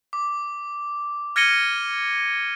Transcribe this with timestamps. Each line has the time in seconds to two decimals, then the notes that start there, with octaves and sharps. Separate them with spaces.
0.13 D6
1.36 F6 G#6 A#6 C#7 D#7 G7